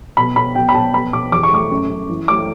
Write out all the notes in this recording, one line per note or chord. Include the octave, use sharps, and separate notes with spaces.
B2 B5
B2 B5
B2 G5
B5
B2 A5
B3 B5
B2 D6
E2 D6
C#6
A3 D6
F#2
F#2
E3
A3 D6